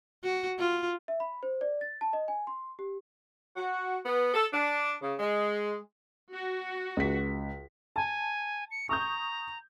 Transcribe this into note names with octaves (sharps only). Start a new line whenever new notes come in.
F#4
F4
E5
B5
C5
D5
A6
A5
D#5
G#5
C6
G4
F#4
B3
A4
D4
C#3
G#3
F#4
C#2 B6
G#5 A5
C#7
A#5 C#6 D#6 G6